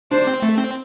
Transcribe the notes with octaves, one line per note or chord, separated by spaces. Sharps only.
D4 C5
C4
A3
C4